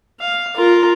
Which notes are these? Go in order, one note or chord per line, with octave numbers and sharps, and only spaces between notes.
F5
F4 A#4